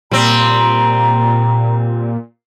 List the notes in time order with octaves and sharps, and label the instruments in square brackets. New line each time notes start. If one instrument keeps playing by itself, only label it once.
[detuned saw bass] A#2 [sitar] G3 C4 [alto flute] A#5